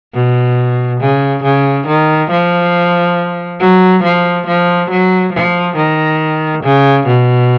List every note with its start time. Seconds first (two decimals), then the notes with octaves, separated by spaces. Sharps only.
0.14 B2
1.00 C#3
1.43 C#3
1.87 D#3
2.31 F3
3.60 F#3
4.03 F3
4.47 F3
4.90 F#3
5.33 F3
5.76 D#3
6.64 C#3
7.07 B2